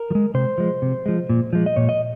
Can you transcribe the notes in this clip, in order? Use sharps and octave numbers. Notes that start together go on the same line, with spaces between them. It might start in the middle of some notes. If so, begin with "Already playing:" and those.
Already playing: A#4
F3
G#3
C3 C5
F3 G#3
C3
F3 G#3
A#2
F3 G#3
D#5
A#2 C#5
D#5